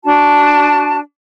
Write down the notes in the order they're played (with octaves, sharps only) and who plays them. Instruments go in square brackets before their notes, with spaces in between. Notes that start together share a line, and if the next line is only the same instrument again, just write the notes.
[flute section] D4 F#4 A5